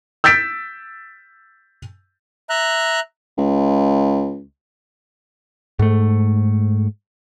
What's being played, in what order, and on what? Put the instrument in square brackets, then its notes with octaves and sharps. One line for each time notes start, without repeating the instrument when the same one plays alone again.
[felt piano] E6 G6 A6 B6 D7
[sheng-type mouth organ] E5 A#5 F#6
[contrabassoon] C#2
[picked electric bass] G#2 A3